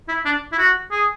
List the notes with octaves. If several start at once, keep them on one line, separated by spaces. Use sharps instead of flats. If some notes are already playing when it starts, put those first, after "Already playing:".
E4
D4
E4
F#4
G#4